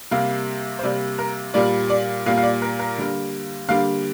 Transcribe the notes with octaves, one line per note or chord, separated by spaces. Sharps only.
C3 G3 A#3 F5
C5
C3 G3 A#3 D5
A#4
A#2 G3 A#3 D5
D5
A#2 G3 A#3 F5
F5
D5
A#4
A#4
D3 G3 A#3
D3 G3 A#3 F5